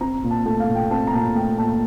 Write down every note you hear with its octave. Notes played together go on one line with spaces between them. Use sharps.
C4 A#5
A#2
A5
A3 A5
F5
A#2
G5
C4 A5
A#5
A#2 A5
A3 G5
A#2 A5